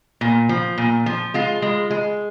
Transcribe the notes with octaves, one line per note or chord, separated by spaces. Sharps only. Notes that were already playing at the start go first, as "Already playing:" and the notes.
A#2
F3
A#2
F3
G#3 F4
G#3
G#3